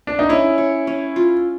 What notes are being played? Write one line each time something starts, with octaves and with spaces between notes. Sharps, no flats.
D4
D#4
C#4 E4
C#5
C#4
F4